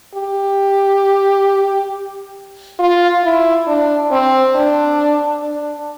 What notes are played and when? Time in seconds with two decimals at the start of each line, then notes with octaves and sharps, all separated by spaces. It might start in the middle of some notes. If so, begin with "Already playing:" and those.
0.15 G4
2.79 F4
3.24 E4
3.67 D4
4.11 C4
4.55 D4
5.43 D4